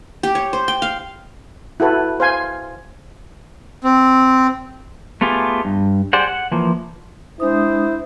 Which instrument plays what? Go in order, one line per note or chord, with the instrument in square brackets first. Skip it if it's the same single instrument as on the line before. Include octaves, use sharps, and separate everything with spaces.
[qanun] G4
C#5
C5
G5
F5
[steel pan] E4 F#4 A4 B4
C5 F5 G#5
[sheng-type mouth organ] C4
[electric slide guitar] A3 B3 F4 G4 G#4
G2
G4 G#4 C5 D5 F#5
F#5
E3 F3 A#3
[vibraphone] G#3 D4 D#6 [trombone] E4 [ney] C5